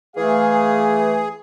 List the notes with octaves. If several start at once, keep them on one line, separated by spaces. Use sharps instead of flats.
E3 A3 G#4 F5